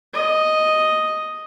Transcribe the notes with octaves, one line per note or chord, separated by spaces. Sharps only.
D#5